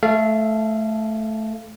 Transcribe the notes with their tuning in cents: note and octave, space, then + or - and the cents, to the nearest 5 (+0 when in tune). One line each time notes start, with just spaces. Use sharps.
A3 -10 A4 -15 F5 -30